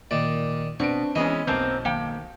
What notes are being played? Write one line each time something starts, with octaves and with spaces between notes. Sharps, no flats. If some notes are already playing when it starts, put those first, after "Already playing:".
A#2 D#3 D5
B2 C4 D4 B4 A5 C#6 D7
E3 G#3 B3 C#4 D#5
B1 F#2 A#3 C4 A5 G6
D#3 A#3 G5